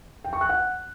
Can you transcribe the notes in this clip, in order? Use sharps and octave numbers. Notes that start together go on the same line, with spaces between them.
G5
C#6
F#6
F#5